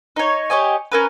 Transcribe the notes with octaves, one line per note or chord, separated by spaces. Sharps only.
D#4 C#5
G4 C#5 D#5 G#5
C#4 A#4 B4